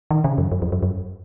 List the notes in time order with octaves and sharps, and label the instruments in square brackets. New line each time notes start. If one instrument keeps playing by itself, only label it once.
[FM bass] D#3
C#3
F#2
F#2
F2
F#2
F#2